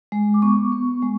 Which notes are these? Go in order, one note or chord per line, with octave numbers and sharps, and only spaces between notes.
G#3
D6
B3 C#6
B3
G#3